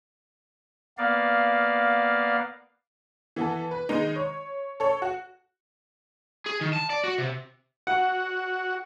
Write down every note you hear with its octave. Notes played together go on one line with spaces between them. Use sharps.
A#3 B3 D5 F5
E3 B3 A4
B4
D#3 G#3 D#4
C#5
A4 C#5
F#4
G#4
D#3
A5
D5
F#4
C3
F#4 F#5